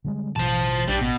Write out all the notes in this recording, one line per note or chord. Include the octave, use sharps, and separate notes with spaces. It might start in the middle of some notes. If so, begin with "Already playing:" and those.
D3 G3 G#3
A1 B2 E3 C5 A5
A#1 G3 D4
A1 B2